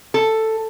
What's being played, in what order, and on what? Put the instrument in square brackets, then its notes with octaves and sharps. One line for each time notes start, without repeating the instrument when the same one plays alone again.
[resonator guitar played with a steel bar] A4